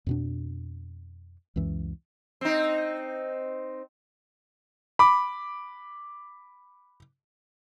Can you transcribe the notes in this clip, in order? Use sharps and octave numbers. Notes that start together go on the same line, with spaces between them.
F2 B2 D4
C#2 F#2 E3
C4 D#4
B5 D6